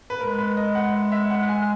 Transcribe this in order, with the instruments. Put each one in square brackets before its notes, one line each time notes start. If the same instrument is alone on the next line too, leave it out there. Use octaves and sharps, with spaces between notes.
[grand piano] B4
[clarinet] G#3 [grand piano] A#4
[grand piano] B4
D#5
F#5
E5
E5
F#5
G#5